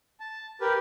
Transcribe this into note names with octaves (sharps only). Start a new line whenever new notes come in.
A5
G4 A#4 B4